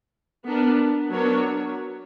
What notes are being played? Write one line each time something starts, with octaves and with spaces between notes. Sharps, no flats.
B3 D4 A#4
F#3 B3 D4 A#4 C#5